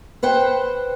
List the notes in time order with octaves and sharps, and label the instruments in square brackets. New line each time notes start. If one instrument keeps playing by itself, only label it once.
[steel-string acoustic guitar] B4 C5 F#5 G5